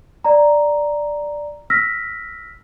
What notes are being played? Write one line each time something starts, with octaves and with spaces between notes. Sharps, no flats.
D5 A#5
E6 F6 A#6 B6